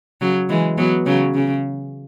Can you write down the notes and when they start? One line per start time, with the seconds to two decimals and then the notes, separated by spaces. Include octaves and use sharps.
0.21 C#3 F#3
0.49 E3 G#3
0.78 F#3 B3
1.06 C#3 F#3
1.35 C#3